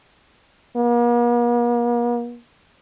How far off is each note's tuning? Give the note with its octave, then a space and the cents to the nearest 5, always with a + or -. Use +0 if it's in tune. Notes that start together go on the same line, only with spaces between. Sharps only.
A#3 +45